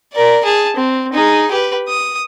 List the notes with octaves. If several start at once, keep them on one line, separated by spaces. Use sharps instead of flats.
A#4 D5
G#4 A5
C4
D#4 G#4
G4 B4
D#6